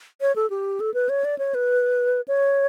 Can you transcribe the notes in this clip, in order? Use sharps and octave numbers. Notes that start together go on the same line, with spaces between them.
C#5
A4
G4
A4
B4
C#5
D5
C#5
B4
C#5